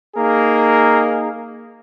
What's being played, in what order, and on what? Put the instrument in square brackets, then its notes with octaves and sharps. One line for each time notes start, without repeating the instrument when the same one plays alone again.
[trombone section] A#3 D#4 G#4 A#4